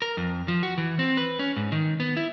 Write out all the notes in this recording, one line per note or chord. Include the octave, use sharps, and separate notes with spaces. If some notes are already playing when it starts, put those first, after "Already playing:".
A#4
F2
F3
F#4
E3
C4
B4
C#4
G#2
D#3
B3
E4